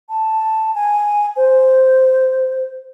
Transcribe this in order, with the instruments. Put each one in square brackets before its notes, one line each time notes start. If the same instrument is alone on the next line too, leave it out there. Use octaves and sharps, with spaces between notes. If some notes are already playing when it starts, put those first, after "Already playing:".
[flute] A5
G#5
C5